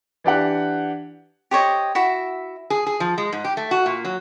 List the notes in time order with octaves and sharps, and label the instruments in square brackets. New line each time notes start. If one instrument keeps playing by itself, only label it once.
[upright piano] E3 D4 G4 F#5
[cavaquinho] G4 C5 C#5 D#5
E4 F#4 E5
[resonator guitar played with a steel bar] G#4
G#4
F3
G#3
G#2
G4
A3
F#4
A#2
F#3